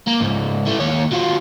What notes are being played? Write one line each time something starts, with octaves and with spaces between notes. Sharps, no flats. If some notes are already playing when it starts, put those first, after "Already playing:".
A#3
C#2 G#2
E3 A3
D#2 C#5
F#3 F4